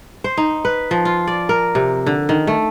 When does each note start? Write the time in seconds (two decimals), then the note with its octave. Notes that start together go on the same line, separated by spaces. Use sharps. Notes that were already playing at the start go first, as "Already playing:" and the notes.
0.24 C5
0.37 D#4
0.65 B4
0.91 F3
1.05 F4
1.27 D5
1.49 A#4
1.75 C3
2.06 D3
2.29 D#3
2.47 A3